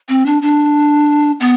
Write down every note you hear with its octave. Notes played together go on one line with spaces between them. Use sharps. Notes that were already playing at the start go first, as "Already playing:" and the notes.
C4
D4
D4
B3